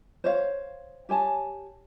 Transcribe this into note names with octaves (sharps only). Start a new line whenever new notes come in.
C5 C#5 F5
G4 C#5 G#5 A5